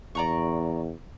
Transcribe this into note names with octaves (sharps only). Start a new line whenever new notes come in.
E2 D5 A#5 C#6